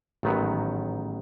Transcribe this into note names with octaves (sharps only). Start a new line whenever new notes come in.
A1 G#2 D#3 F#3 B3